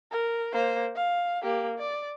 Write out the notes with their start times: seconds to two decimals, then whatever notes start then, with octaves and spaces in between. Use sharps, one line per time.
0.11 A#4
0.53 A#3 C5
0.96 F5
1.43 A#3 G4
1.79 D5